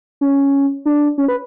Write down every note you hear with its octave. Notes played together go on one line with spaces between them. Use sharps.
C#4
D4
C#4
B4